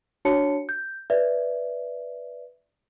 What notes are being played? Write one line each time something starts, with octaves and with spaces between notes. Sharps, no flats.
D4 F#4 C#5 A5 C#7
G6
B4 D5 E5